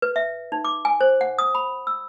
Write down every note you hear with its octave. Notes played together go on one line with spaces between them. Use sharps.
B4
E5
D#4
D6
G#5
C5
F#5
D#6
B5
E6